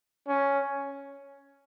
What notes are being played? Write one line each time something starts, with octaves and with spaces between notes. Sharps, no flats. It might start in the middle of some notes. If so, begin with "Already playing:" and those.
C#4